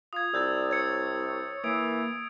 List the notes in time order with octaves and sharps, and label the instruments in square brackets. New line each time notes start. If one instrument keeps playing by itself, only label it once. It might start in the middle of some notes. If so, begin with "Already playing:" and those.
[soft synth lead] F4 [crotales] D#6 G#6
[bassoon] C2 [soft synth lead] D5 [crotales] E6 G6 A6
[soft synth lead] C#5 [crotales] D#6 G#6 C#7
[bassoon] E3 [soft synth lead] A#3 [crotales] D#6 G#6 D7